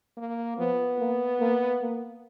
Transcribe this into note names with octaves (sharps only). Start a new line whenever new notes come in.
A#3
F3 B3
A#3
A#3
A#3